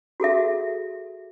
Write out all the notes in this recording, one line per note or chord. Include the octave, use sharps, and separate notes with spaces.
F#4 G#4 A4 E5